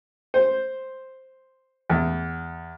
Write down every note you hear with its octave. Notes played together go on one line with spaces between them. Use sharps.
C5
E2